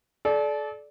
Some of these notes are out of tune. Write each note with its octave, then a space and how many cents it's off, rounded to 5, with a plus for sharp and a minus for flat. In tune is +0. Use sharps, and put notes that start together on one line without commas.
A4 -35 D5 -5